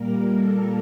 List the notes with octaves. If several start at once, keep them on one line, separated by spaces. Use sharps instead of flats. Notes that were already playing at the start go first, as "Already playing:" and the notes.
Already playing: A#2 G3 A#3 A#4
A4